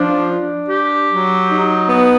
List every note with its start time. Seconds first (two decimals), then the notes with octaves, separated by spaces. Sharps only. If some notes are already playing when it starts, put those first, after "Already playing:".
Already playing: F3 D4
0.29 D4
0.69 G4
1.09 F#3
1.49 D#4
1.89 B3